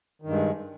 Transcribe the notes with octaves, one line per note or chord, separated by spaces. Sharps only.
G2 D#3 G#3